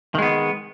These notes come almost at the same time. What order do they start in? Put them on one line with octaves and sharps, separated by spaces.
D#3 G#3 B3